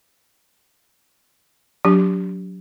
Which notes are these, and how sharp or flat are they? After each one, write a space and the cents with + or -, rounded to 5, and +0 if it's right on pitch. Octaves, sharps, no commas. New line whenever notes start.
F#3 -10 D4 -30 G4 -5